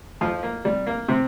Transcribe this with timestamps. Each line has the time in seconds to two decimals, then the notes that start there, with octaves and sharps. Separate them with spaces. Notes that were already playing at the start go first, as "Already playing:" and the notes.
0.21 F2 F3 F4
0.43 A#3
0.65 C3 G3
0.86 A#3
1.08 C3 C4